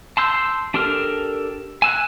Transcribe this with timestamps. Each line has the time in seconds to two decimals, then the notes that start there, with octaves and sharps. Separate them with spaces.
0.17 A5 C6 E6 G6
0.74 D4 G4 A4 A#4 F6
1.82 G#5 E6 F#6